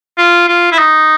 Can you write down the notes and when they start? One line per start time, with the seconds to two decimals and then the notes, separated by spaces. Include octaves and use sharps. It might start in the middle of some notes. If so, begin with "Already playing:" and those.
0.18 F4
0.48 F4
0.72 E4
0.78 D#4